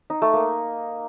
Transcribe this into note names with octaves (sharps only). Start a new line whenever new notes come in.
D#4
A3
A#3